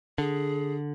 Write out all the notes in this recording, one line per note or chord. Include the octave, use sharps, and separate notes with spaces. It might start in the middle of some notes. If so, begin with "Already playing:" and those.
D3 G#4